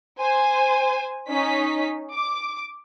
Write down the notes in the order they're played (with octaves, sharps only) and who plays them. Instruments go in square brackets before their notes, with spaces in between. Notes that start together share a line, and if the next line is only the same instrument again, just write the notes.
[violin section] C5 G#5
C#4 D#4 B6
D6